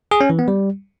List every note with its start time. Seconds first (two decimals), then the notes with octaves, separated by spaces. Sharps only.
0.11 G#4
0.21 C#4
0.30 E3
0.39 B3
0.48 G3